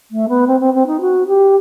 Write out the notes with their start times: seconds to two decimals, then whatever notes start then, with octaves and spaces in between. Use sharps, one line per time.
0.11 A3
0.29 B3
0.47 C4
0.60 C4
0.74 C4
0.87 D#4
1.01 F#4
1.27 G4